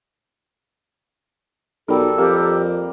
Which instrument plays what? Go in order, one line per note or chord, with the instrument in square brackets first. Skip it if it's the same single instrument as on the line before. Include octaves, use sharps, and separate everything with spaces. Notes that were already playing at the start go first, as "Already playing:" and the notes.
[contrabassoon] B1 [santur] G3 A#4 [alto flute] A4
[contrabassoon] F2 [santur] A#3 [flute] G4